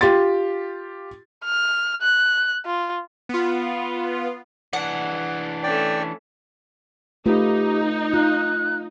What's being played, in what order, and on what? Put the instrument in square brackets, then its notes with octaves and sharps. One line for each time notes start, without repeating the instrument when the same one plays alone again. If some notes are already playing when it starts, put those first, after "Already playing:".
[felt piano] F4 G4 C6 A6
[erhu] F6
F#6
F4
[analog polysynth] B3 F4
[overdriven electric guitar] E3 D4 [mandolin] F#5
[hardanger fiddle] A3 C#4 [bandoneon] D5 G5
[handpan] A3 F4 B4 [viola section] D#4 [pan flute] G4
[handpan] F4 [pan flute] F#6